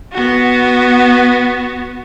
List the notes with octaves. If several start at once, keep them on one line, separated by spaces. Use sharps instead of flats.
B3 F#4